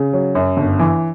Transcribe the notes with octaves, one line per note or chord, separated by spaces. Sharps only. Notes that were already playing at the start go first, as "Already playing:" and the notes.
Already playing: C#3
F#3
F#2
G1
E3